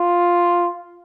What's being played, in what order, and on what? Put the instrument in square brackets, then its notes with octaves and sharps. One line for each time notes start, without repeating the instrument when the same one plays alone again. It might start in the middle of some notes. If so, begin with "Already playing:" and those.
Already playing: [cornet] F4